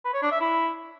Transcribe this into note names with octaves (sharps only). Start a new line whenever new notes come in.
B4
C#5
D4
E5
E4